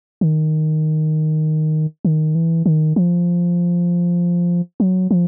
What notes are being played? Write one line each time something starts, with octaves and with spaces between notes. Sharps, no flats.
D#3
D#3
E3
D#3
F3
F#3
F3